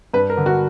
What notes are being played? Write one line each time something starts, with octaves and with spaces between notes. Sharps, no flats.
G2 B4
A#4
D3
F#4